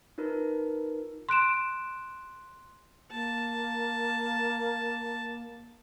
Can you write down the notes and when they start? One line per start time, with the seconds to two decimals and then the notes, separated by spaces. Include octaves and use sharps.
0.18 D#4 F4 A#4 B4
1.29 C6 F#6 D7 E7
3.11 A#3 A5